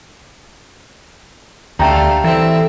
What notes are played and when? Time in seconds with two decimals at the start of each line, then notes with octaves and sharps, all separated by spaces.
1.79 D2 A3 G4 D5 F5 G5 A#5
2.24 E3 C4 A4 E5